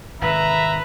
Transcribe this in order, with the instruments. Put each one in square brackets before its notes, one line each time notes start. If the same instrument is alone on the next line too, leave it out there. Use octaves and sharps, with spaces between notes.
[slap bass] G#1 C3 D#3 [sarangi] B4 [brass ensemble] E5 [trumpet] A#5